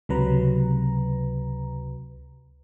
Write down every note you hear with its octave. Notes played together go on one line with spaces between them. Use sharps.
C#2 C3 F#3 B4 A#5